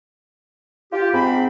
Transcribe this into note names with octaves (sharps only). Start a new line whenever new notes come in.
F4 G4
G#2 C4 B5